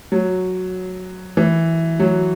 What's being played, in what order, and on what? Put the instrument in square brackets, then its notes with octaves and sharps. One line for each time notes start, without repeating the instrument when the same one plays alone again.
[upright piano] F#3
E3
F#3